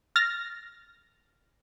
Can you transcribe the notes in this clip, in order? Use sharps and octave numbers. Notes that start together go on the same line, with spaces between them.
F6 A6 A#6